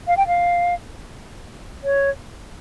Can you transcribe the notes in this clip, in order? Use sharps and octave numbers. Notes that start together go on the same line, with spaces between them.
F5
G5
F5
C#5